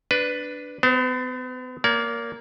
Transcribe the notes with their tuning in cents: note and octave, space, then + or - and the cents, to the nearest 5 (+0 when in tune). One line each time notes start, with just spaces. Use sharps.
D4 +0 B4 +5
B3 +40 C5 +0
A#3 +0 D5 -45